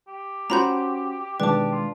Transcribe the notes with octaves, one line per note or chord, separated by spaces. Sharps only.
G4
C#4 F#4 C5 A#5 B5 G6
B2 D#3 G#3 D4 G4 B4 A5 D6
F4